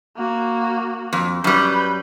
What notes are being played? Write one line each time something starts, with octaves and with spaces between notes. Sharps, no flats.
A#3 F#4
F2
F#2 G3 B4 G6